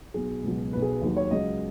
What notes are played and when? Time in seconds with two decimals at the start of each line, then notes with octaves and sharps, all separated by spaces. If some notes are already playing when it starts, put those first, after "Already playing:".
0.14 B1 B2 F#3 G#4
0.43 C#2 B2 F#3
0.73 B1 B2 F#3 B4
0.82 G#4
0.92 B4
1.02 D#2 D#3 F#3
1.17 C#5
1.31 C#2 C#3 F#3 D#5